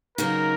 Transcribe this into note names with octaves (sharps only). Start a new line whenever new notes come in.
C#3 F#3 A#3 D#4 F#4 A#4